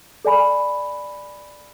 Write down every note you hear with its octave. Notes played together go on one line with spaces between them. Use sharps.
A4 D5 G#5 B5